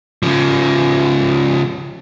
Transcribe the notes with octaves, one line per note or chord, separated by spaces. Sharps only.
C#3 F3